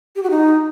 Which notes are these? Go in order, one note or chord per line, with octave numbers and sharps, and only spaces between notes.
G4
F#4
D#4